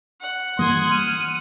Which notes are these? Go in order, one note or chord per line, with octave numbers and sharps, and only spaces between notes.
F#5
E3 G3 A#3 C6 D#6 G#6
F6 D#7